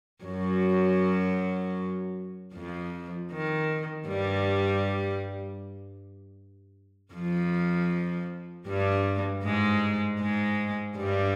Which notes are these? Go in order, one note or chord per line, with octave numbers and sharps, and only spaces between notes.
F#2 F#3
F2 F3
D#3
G2 G3
F2 F3
G2 G3
G#2 G#3
G#2 G#3
G2 G3